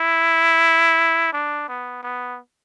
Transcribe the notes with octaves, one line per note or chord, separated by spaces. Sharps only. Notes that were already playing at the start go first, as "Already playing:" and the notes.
Already playing: E4
D4
B3
B3